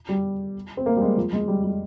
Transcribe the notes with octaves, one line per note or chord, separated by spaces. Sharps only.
G3
C4
A#3
G3
G#3
F3
G#3
G3
G3